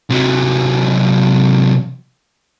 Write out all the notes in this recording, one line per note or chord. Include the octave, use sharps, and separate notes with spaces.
C3 F#3